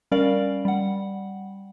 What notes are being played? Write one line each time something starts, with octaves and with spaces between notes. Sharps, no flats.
G3 C#4 A#4 D5 F5
G3 F#5